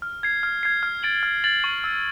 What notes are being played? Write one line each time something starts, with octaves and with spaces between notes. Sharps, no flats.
F6
G#6 C7
F6
G#6 C7
F6
A6 D7 F#7
F6
A6 D7 F#7
C#6
E6 A6